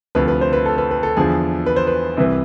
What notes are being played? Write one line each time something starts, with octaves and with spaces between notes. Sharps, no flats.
D2 C3 F3 B4
B4
C5
B4
A4
B4
B4
A4
E2 D3 F3 G#4
B4
C5
B4
C2 C3 E3